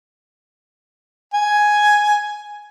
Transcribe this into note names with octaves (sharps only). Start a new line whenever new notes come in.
G#5